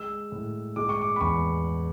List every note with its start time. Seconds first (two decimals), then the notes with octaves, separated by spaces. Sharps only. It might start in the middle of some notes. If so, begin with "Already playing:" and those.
Already playing: G#3 E6
0.32 A2
0.76 G#3 D6
0.89 C#6
1.02 D6
1.16 B5
1.21 E2 C#6